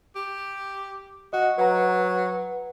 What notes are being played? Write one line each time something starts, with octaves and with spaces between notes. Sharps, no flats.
G4
F#4 D#5 F#5
F#3 B4 F#5 A#5